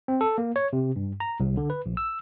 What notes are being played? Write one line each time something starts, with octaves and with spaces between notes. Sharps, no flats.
C4
A4
A#3
C#5
C3
G2
A#5
C2
D3
B4
A#1
E6